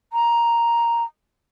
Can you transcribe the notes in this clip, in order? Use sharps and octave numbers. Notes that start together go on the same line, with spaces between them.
A#5